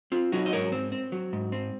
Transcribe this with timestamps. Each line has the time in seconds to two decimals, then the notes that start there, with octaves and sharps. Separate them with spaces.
0.12 C4 F4
0.32 F#3 D#4 F#4
0.46 D#5
0.52 G#2 A#4 C#5
0.72 C4
0.92 C4
1.12 F#3
1.33 G#2
1.52 C4